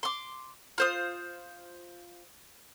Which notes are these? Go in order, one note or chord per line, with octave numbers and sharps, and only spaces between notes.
C6 D6
F4 C5 D#6